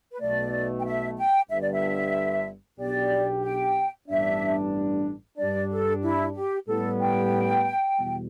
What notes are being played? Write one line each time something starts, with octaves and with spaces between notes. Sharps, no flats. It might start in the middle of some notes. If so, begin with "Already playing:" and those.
B4
B1 B2 A3 D5
G5
E5
G5
G1 G2 D3 E5
D5
E5
B1 B2 B3 D4 G4 D5
G5
A1 G2 G3 B3 D4 E5
G2 G3 D4 D5
A4
E4
G4
A2 G3 B3 A4
G5
E2 B2 G3